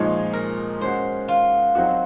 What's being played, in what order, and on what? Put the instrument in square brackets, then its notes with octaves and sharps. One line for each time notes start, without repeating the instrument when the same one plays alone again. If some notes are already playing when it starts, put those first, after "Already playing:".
Already playing: [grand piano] A#2 F3 G#3 D#4 [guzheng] C#5
[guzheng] A#4
[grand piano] G#3 C#4 F#4 [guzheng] C5
[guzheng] F4
[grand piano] F#3 C4 D#4 F#4